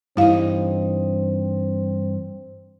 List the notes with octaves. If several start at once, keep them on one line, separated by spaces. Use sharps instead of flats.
G2 E3 C4 D#4 E4 F5